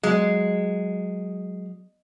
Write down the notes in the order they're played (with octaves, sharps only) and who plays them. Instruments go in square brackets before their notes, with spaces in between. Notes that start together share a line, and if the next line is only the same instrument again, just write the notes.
[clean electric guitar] F#3 [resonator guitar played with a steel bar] G#3